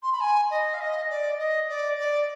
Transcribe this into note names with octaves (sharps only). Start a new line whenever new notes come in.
C6
B5
G#5
D#5
F5
D#5
D5
D#5
D5
D5